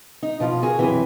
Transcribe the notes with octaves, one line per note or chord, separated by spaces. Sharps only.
D#4
B2 F3 F4
F#4 G#4 A#4
F#2 C3 E3